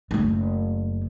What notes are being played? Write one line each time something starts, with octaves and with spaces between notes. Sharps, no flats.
F#1 A3